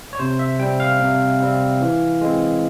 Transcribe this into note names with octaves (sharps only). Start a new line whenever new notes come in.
C#5
C3 C5
E5
G3 C4 G5
F5
C3
G3 C4
E3
G#3 C4